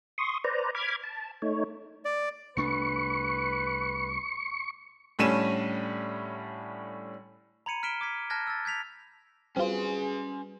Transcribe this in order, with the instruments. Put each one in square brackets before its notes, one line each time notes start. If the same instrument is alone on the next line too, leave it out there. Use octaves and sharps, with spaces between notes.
[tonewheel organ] C6 C#6 D#6
B4 C5 D5 A#5
B5 D6 F6 G#6
A5
A3 D#4 C#5
[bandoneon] D5
[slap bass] C2 A3 D4 [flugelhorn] B4 [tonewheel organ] C#6
[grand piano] A2 D3 G3 C#4 D#7 E7
[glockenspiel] A#5 B5 G#6 C#7 D#7
F6 B6 D7 E7 G7
D6 G#6 B6
A5 F6 F#6 G#6 A#6
E6 A6
G6 G#6 B6 F7
[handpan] G3 F#4 B4 [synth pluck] C4 F4 [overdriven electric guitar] C#4 C6 [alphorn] G#4